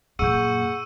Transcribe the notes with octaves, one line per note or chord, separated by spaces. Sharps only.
F#2 A#2 G#4 F#5 C#6 E6 G6 D#7